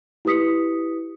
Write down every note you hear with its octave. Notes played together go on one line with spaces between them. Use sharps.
E4 G4 B4 D#6 B6 C#7